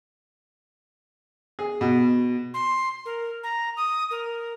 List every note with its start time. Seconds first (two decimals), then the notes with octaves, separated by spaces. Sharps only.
1.59 G#4
1.81 B2
2.54 C6
3.05 A#4
3.43 A#5
3.77 D#6
4.11 A#4